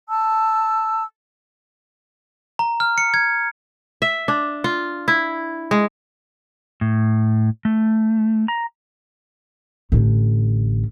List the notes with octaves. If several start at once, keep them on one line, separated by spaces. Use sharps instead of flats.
A5 E6
A#5
F6
C#7
G#6
E5
D4
F4
E4
G#3
A2
A3
A#5
A1 D3